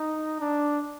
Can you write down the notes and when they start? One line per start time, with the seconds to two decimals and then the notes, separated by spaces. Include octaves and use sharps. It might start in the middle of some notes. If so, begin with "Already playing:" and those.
Already playing: D#4
0.40 D4